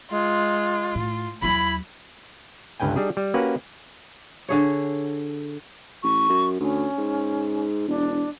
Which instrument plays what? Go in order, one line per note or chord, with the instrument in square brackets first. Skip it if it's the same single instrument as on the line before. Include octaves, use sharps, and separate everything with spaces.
[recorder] G#3 [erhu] F4
[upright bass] A2
[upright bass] D#2 F#3 [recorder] E4 [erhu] B5
[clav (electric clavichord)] G1 C#2 G2 B4 G5 G#5
G3 D4 D#4 G#4
G3
A#3 C#4 F#4 G4 B4
[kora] D3 G#4 C#5
[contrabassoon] A1 [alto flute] C#6
[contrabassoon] F#2
[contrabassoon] D2 [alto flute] C#4
[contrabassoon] G#2
[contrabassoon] E1 [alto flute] D4